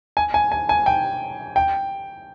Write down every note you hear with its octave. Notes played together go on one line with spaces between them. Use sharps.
G#5
G#5
G#5
G#5
G5
G5